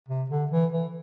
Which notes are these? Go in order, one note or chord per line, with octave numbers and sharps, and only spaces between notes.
C3
D3
E3
E3